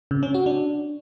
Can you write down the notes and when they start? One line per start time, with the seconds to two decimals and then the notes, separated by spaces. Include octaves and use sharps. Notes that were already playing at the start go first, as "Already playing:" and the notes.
0.11 C#3
0.23 C#4
0.34 F#4
0.46 D4